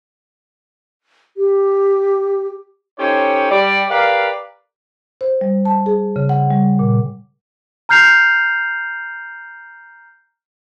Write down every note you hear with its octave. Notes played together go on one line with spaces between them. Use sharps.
G4
C#4 D#4 G4 A4 C5 C#5
G3 D5
G4 A#4 B4 D5 F5
C5
G3
A5
G#4
C#3
F#5
G3
A#2
A#5 F6 G6 C7 F7